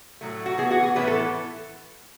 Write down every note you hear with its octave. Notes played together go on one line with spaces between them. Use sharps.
A2 F#3 A3
F#4
A2 E3 B3 E4 G#4
F#4
G#4
A2 E3 B3 E4 B4
A4